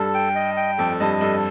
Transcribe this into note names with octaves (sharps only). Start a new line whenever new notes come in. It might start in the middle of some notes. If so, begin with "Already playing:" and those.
Already playing: G2 A4
G5
D#5
G5
F2 A4
G2 D#5
G2 A4